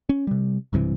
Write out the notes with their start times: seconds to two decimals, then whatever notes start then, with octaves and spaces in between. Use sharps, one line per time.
0.09 C#4
0.27 C3 G3
0.73 B1 G2 C3 E3